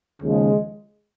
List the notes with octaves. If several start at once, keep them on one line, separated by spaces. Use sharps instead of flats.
D#2 C#3 F3 G#3